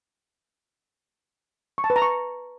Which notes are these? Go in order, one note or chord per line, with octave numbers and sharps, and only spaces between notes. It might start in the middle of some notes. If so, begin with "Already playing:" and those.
C#6
A5
B4
A#5
C#6